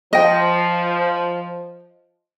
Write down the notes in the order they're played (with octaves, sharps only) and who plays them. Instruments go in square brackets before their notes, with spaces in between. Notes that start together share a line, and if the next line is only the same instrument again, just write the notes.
[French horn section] F3 [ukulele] D#5 G5